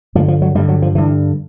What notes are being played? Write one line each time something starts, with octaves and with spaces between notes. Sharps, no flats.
G2 D3 F3
F3
F#3
G2 D3 G3
F#3
F3
G2 D3 E3